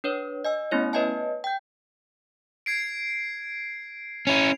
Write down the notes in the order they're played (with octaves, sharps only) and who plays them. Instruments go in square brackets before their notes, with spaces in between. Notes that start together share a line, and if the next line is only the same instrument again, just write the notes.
[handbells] D4 B4 C#5
D#5 G#5 E6
A3 B3 C#4 E4 C#5
B4 C#5 D#5 E5 G#5 A5
G5 G6
[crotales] G#6 C7 D7
[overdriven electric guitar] C#4 E4 [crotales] F7